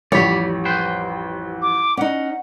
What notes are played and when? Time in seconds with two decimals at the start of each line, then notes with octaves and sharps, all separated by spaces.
0.12 A1 F2 G3 C#5 D5 B5
0.65 B4 C5 G5
1.62 D6
1.97 C#4 D#4 F#5